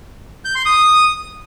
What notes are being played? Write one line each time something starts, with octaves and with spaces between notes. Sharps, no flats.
G6
C6
D#6